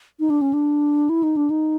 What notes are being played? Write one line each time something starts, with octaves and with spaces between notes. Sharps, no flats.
D#4
D4
C#4
D4
E4
D#4
D4
D#4